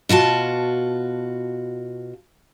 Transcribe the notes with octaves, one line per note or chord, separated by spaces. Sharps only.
B2 F4 F#4 A5